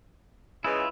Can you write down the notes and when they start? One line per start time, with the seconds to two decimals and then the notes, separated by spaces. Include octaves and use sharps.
0.64 C#3 E3 G#3 E4 F4